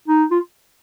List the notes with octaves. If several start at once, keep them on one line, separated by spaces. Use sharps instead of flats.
D#4
F4